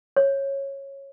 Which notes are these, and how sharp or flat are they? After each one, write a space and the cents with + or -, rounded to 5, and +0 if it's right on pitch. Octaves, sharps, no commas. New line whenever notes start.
C#5 -15